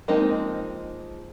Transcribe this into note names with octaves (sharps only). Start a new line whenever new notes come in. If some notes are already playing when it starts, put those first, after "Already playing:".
F3 G#3 A#3 C4 D#4